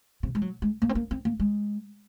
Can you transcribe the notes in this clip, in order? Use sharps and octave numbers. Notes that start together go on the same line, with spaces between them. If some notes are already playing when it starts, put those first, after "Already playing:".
C3
G#3
F#3
G#3
A#3
C4
A#3
C4
A#3
G#3